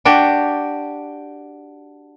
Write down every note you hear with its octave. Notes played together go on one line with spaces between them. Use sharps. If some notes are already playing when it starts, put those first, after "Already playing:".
D4 F#4 G4